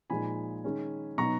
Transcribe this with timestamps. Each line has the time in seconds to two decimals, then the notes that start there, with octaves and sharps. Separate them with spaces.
0.10 A#2 F3 G#3 D#4 G#5 B5
0.64 D#3 G#3 C#4
1.18 B2 F#3 B3 D#4 A#5 C#6